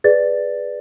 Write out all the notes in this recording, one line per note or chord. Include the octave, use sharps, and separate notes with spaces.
G#4 B4 D5 A6